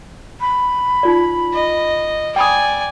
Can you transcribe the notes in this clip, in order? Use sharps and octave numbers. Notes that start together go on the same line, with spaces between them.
B5
D#4 F4 D5
D#5
D5 G5 G#5 B5 D#6